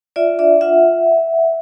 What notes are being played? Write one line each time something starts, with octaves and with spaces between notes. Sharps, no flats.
F4 D5 E5
D4 D5 E5
F4 E5 F#5